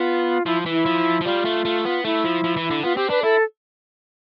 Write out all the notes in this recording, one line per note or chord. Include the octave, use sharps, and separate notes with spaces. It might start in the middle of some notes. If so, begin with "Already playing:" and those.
Already playing: B3 F4
F3 E4
E3 E4
F3
F3
G3 F4
A3
A3
B3
A3 E4
F3
F3
E3
D3
B3 F4
C4 G4
D4 B4
E4 A4